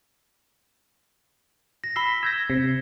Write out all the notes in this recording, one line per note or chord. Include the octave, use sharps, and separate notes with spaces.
A#6
B5 E6 B6 C7 G7
E6 G6 G#6 A#6
C3